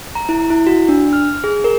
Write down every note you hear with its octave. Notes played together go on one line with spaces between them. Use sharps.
A#5
E4
E4
F#4
D4
F6
G#4
A#4